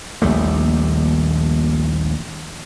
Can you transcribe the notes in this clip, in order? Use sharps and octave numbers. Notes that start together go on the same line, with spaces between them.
A#1 D#2 G3 A3